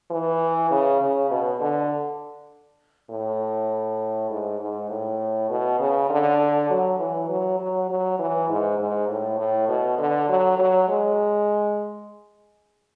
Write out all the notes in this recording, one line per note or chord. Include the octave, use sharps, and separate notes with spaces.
E3
C#3
C#3
B2
D3
A2
G#2
G#2
A2
B2
C#3
D3
F#3
E3
F#3
F#3
F#3
E3
G#2
G#2
A2
A2
B2
D3
F#3
F#3
G#3